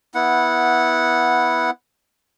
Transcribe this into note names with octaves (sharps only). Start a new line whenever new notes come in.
B3 E4 F#5